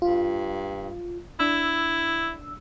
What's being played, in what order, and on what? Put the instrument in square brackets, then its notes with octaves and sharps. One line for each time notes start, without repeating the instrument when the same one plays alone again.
[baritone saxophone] G2 [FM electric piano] F4
[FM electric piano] D4 E6 [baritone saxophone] E4